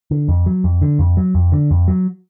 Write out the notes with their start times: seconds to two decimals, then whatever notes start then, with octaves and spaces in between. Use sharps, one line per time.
0.11 D3
0.28 F2
0.46 F#3
0.64 F2
0.82 D3
0.99 F2
1.17 F#3
1.35 F2
1.52 D3
1.71 F2
1.88 F#3